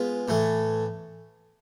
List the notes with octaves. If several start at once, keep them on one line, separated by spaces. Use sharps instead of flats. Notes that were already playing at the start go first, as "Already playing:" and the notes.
Already playing: G#3 B3 F4
A2 E3 A3